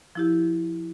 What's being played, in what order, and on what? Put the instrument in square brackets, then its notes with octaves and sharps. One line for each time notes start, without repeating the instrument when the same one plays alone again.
[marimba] F3 E4 G4